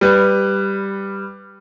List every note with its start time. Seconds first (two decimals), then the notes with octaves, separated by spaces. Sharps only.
0.01 G3 B4